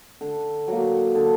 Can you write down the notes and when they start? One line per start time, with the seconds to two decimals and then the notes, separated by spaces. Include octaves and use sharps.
0.21 D3
0.68 F#3 A#3
1.15 D3